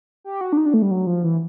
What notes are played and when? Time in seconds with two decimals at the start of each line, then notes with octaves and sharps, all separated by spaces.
0.24 G4
0.41 F#4
0.53 D4
0.57 D#4
0.66 D4
0.74 A3
0.82 G3
0.91 F#3
1.07 F3
1.24 E3